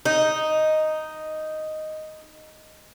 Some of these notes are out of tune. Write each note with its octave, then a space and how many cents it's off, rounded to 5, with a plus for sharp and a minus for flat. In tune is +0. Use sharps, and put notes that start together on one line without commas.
D#4 +0